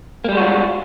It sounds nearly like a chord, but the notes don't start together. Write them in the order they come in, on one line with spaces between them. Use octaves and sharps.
A#3 G3 G#3 F#4 F4